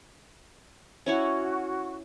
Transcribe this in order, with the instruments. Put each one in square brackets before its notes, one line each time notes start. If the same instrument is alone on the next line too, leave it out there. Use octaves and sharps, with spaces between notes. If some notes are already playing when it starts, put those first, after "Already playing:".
[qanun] C#4 E4 C#5 [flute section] F#4